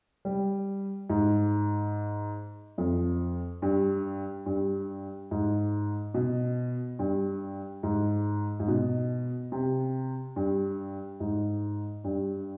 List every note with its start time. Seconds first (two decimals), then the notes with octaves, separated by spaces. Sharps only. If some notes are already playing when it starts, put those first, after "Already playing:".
0.25 G3
1.10 G#2
2.78 F2
3.62 G2
4.46 G2
5.31 G#2
6.14 B2
6.99 G2
7.83 G#2
8.60 G#2
8.68 B2
9.52 C3
10.36 G2
11.20 G#2
12.04 G2